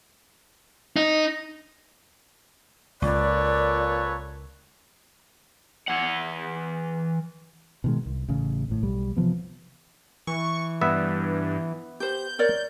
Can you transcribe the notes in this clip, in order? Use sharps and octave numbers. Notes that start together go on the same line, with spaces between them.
D#4
C#2 A#2 A4 B4 C#5 D5
E3 F#5
B2 D#3 G#3
C2
A1 C#3
G#1 A2
B1 G3
C3 E3 F3 B3
E3 C#6
G2 B3 E5
G4 C5 G6
A#4 C#5 D5